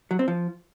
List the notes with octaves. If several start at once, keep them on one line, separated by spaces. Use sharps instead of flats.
F#3
C4
F3